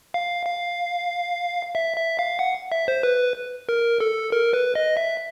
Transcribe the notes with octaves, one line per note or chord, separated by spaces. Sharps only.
F5
F5
E5
E5
F5
F#5
E5
C5
B4
A#4
A4
A#4
B4
D#5
E5